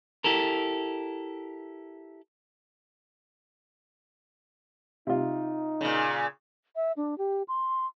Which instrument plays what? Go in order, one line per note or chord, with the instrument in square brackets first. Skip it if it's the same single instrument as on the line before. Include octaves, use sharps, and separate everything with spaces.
[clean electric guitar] E4 G4 A4 A#4
[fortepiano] C3 F4 [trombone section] D#4
[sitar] A#2 C#3
[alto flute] E5
D4
G4
C6